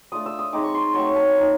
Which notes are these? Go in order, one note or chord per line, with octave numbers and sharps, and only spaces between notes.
A3 D4 F4 D#6
E6
D#6
G#3 C4 D#4 D6
C#6
C6
F#3 A3 C4 C#6
A5
F3 A#3 D#4